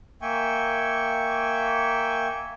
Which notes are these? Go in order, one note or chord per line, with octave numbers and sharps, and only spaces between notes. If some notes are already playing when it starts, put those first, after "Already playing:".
A#3 E5 G5 G#5 C#6